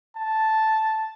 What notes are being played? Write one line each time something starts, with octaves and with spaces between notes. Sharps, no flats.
A5